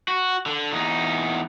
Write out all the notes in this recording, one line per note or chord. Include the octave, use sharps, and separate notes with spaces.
F#4
D3
E2 D#4